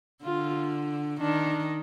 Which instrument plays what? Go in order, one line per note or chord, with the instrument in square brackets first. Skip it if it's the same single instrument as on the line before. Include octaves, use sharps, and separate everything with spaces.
[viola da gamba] D3 [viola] F4
[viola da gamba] D#3 [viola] D4